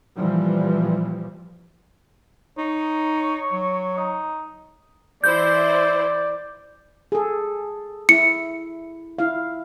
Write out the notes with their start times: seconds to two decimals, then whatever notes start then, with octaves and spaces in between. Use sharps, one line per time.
0.16 A#2 E3 F3 G3
2.58 D#4 C#5
3.53 F#3
3.97 D#4
5.24 E3 E4 C5 D5 G6
7.12 G#4 A4
8.09 E4 C#7
9.18 E4 F5